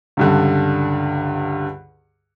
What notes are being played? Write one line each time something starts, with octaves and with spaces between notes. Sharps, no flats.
C#2 G2 D3